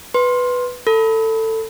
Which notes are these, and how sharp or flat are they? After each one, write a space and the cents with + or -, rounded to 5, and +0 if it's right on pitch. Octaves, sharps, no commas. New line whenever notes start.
B4 +0 C6 +10
A4 +20 B5 +0